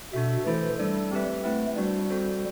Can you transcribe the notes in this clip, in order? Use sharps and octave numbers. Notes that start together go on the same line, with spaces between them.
B2 D4 F#4 A4 E5
E3 A3 E4 A4 C5
G3 A3 D4 A4
C4 G4 B4 E5
A3 C4 E4 B4 F#5
G3 D4 F#4 C5
C4 F#4 A4 C5